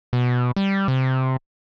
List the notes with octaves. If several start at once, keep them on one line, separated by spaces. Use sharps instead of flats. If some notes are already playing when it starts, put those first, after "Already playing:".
B2
G3
C3